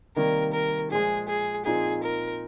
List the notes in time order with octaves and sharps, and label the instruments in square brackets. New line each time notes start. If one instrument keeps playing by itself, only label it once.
[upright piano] C3 D#3 G3 A#3 [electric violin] A#4
[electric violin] A#4
[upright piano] A#2 F3 G#3 [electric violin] G#4
[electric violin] G#4
[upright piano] A#2 F3 C4 D#4 [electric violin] G#4
[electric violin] A#4